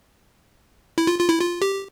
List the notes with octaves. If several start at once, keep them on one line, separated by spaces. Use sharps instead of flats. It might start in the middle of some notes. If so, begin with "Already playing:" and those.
E4
F4
F4
E4
F4
G4